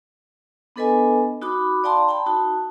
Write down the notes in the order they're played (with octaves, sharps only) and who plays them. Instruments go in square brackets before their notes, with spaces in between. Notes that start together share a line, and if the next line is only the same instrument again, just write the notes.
[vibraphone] B3 D4 A4 B4 D#5 G#5
D#4 F#4 B5 D6
D5 F5 G5 A5 A#5 C6
G5 A5 B5
D#4 F#4 A5